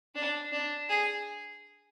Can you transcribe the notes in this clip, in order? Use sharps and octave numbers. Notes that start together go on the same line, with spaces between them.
D4
D4
G#4